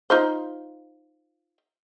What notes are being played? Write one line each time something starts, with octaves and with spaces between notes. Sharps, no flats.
D#4 F4 C5